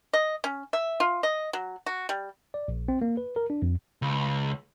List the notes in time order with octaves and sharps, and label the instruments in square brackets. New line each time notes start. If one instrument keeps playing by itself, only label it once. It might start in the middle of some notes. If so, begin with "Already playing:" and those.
[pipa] D#5
C#4
E5
F4
D#5
F#3
F#4
G3
[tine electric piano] D5
A#1
C4
A#3
B4
A#4
D4
F2
[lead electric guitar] C#2